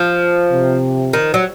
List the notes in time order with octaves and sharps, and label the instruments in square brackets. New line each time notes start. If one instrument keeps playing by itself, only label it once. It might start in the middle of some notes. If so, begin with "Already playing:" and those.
Already playing: [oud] F3
[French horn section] C3
[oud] D#3
F#3